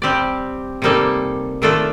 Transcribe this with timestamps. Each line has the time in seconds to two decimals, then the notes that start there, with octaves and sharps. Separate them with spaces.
0.02 G3 C4 G4 D5
0.82 C3 G3 A#3 D#4 A4
1.62 D#3 A3 D4 F4 A4